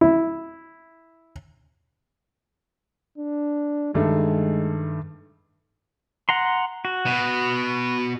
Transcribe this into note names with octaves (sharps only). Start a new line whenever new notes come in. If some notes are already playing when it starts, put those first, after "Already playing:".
E4
D4
G2 D#3 G#3 A3
F#5 A#5 C6
F#4
B2